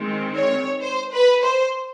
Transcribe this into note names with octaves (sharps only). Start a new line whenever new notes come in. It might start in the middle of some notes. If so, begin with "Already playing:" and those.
Already playing: D#3 G#3 C4
C#5
C5
B4
C5